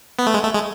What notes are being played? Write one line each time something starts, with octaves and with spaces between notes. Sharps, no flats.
B3
A3
G#3
A3
G#3